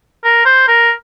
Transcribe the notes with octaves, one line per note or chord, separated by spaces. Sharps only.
A#4
C5
A#4